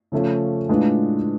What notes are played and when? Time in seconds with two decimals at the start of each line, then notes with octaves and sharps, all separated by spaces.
0.12 C#3 F3 A3 C#4
0.69 A2 G#3 D4 F4 B4